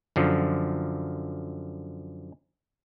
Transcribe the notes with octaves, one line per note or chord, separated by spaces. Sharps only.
F#2 D3 F3